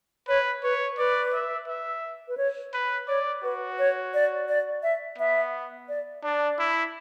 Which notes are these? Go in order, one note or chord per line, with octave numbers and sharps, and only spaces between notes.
B4 C#5
B4 C#5
B4 D5
E5
E5
B4
C#5
B4
C#5 D5
F#4 B4
C#5
D5
D5
E5
B3 E5
D5
D4 D5
E4